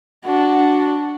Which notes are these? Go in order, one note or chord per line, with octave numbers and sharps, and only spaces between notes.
D4 F#4